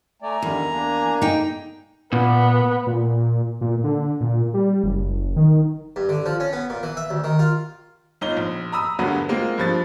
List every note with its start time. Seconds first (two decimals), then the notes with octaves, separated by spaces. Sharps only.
0.22 A3 D5 G#5 A#5
0.42 E2 D3 D#3 G3
0.73 A#3 D4
1.22 D#4 G5
2.13 A#2 B3
2.87 A#2
3.61 A#2
3.84 D3
4.20 A#2
4.54 G3
4.84 F#1
5.36 D#3
5.96 G2
6.09 D3
6.26 F3
6.40 C#4
6.53 B3
6.70 A#2
6.83 E3
6.97 E5
7.10 D2
7.24 D#3
7.39 F4
8.21 G1 D#4 F4 G7
8.37 A#1
8.72 A#5 B5 D#6 E6
8.99 E2 G2 D3 F#3 A#3 B3
9.29 G#3 A#3 C4 F4
9.58 G2 F3 A6